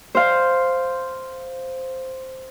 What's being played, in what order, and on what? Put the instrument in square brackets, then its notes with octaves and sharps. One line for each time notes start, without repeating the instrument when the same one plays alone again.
[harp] C5 F5